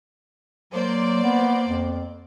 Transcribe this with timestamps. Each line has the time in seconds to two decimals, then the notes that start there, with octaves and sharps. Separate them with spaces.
0.73 F#3 A#3 C5 D5
1.23 B3
1.67 F2